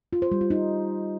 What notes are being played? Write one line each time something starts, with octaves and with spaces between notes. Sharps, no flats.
F4
C5
G3
F4
D#4